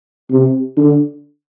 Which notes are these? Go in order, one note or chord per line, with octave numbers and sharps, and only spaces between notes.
C3
D3